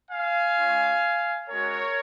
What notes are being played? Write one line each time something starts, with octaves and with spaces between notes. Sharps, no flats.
F5 G#5
G#3 C#4 F4
G#3 C#4 F#4 A#4 C#5